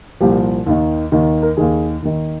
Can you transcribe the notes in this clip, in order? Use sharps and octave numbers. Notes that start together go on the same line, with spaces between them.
C2 A#2 F3 G4
D#2 D#3
D#2 D#3
A#4
D#2 D#3 G#4
D#2 D#3